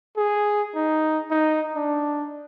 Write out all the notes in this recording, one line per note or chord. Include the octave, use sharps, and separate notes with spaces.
G#4
D#4
D#4
D4